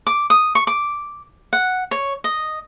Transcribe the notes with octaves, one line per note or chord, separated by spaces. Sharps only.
D6
D#6
C#6
D6
F#5
C#5
D#5